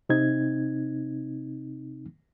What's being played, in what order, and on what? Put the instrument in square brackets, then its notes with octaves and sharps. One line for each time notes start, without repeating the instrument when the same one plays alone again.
[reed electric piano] C3 C4 D#4 G#6